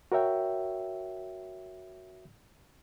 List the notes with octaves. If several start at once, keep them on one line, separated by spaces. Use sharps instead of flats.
F#4 A#4 C#5 E5 G5